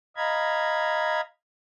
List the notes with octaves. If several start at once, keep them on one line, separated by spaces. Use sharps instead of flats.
D#5 F5 A#5 B5 G#6